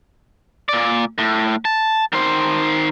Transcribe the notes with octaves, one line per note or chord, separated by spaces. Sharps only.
A#2 D5
A2
A5
D#3 C5